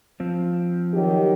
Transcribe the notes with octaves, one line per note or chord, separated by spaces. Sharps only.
F3 C4
D#3 F#3 G4